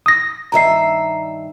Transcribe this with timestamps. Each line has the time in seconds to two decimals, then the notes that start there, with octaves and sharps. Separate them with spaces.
0.06 D#6 A#6
0.52 G2 D#3 E5 A#5 C7